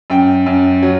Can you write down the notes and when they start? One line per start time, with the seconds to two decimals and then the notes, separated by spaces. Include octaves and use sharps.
0.10 F#2 G5
0.46 F#2
0.83 F#3